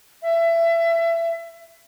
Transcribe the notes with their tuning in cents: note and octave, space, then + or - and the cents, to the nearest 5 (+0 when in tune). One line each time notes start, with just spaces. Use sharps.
E5 +25